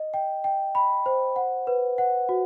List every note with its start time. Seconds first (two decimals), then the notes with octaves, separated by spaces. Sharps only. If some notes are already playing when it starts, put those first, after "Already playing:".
Already playing: D#5
0.14 G5
0.44 G5
0.75 B5
1.06 C5
1.36 F#5
1.67 B4
1.98 F#5
2.29 F#4